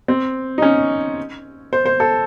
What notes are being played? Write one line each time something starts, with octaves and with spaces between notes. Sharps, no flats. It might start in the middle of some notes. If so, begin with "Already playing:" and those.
C4
D#4
C#4
C5
C5
A4